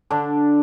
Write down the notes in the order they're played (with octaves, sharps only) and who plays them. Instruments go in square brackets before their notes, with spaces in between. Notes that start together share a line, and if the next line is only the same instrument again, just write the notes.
[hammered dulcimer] D3 D4